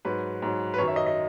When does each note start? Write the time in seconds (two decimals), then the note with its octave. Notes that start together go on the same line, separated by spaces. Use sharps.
0.05 G#2 F#3 B4
0.42 G#2 F#3
0.74 B4
0.78 F#2 D#3 F#3 C#5
0.88 E5
0.96 D#5
1.06 D#5